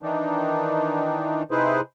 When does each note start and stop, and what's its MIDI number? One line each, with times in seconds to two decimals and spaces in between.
0.02 1.43 51
0.02 1.43 52
0.02 1.43 62
0.02 1.43 63
1.51 1.81 48
1.51 1.81 63
1.51 1.81 64
1.51 1.81 68
1.51 1.81 71
1.51 1.81 72